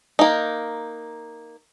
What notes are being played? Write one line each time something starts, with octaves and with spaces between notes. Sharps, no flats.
A#3 D#4